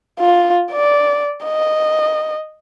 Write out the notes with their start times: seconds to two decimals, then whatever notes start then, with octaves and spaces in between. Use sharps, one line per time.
0.20 F4
0.72 D5
1.45 D#5